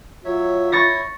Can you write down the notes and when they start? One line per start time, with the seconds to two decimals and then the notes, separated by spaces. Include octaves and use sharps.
0.25 F#3 F4 C#5 E5
0.72 E4 C#5 C#6 A6 A#6